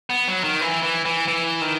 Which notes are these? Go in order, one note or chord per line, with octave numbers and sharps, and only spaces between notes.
B3
F#3
D#3
E3
E3
E3
E3
D#3